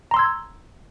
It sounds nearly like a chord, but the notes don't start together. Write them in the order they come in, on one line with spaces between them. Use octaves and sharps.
A#5 C6 E6 G#6